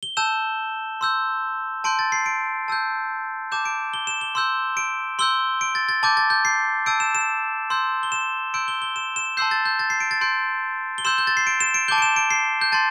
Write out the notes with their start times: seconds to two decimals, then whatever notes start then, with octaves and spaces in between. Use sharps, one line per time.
0.03 G7
0.17 A5 E6 G6 E7
1.01 C6 E6 G6
1.84 A5 C6 G6 D7
1.99 A6
2.12 C7
2.26 D7
2.68 A5 E6 G6
3.52 A5 D6 G6 E7
3.65 D7
3.94 G7
4.07 E7
4.21 G7
4.35 C6 E6 G6
4.77 D7
5.19 C6 E6 G6 G7
5.61 D7
5.75 A6
5.89 A6
6.03 A5 D6 G6 A6
6.17 A6
6.30 G6
6.45 C7
6.86 A5 E6 G6 D7
7.00 E7
7.15 E7
7.70 C6 E6 G6
8.03 G7
8.12 E7
8.54 C6 E6 G6 D7
8.68 G7
8.82 G7
8.96 E7
9.16 E7
9.37 A5 C6 E6 G6 C7
9.51 A6
9.65 G6
9.79 A6
9.90 C7
10.00 D7
10.11 A6
10.21 C6 G6 D7
10.98 G7
11.05 C6 E6 G6 E7
11.18 G6
11.27 A6
11.37 C7
11.47 D7
11.60 E7
11.74 D7
11.88 A5 D6 G6 G7
11.98 D7
12.02 E7
12.16 D7
12.31 C7
12.61 G6
12.72 A5 C6 A6